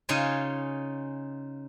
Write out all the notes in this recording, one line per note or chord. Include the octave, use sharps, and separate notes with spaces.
C#3 D#4 F4 G#5